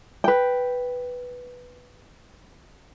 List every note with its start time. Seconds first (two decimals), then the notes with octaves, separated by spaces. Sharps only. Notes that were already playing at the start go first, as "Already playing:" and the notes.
0.24 B4 G5